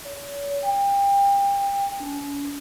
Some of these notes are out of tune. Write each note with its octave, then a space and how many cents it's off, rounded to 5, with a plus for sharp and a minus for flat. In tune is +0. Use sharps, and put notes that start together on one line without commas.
C#5 +40
G5 +30
C#4 +40